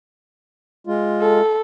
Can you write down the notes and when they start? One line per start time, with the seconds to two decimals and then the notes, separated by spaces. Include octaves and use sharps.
0.87 G#3 F4
1.21 A4